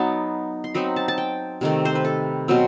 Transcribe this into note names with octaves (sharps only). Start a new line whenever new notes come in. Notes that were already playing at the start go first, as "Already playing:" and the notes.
Already playing: F#3 B3 D#4 A5
C6
F#3 C4 D#4 B5
A5
A5
G5
C3 D#3 A3
C5
B4
A4
B2 F#3 C4